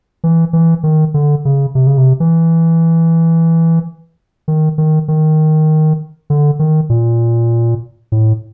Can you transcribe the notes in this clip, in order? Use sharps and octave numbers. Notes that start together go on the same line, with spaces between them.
E3
E3
D#3
D3
C#3
C3
C#3
C3
E3
D#3
D#3
D#3
D3
D#3
A#2
A2